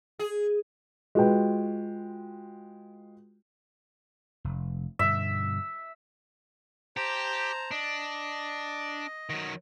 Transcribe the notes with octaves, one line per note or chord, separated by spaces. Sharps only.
G#4
G#3 F4 F#4 B4 G5
F1
G2 B2 D3 E5
G4 C5 A5 A#5
D4 D#5
D#3 F#3